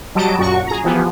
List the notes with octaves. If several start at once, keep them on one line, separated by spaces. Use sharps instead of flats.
F#3 G3 D#5 A5 D7
F#2 A#2 F#4 C#6
G#4 A#5
E3 F3 B3 G4 G#4